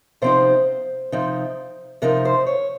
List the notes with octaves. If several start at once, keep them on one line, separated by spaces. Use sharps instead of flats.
C3 F3 C4 D#4 C5
C3 F3 C4 D#4
C3 F3 C4 D#4 A#4
C5
C#5